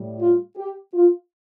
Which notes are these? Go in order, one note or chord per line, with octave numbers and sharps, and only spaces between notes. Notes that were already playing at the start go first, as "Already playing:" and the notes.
Already playing: A2 G3
F4
G4
F4